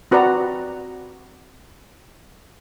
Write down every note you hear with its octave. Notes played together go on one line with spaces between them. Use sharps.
C4 F#4 B4 D5 A#5